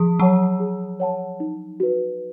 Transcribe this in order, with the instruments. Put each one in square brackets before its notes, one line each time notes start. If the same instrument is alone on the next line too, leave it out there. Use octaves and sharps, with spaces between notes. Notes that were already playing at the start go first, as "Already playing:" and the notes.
Already playing: [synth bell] F3 [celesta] G#4
[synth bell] F#3 [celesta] C#5 F#5 A5
[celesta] G#4
C#5 F#5 A5
D#4
F#4 B4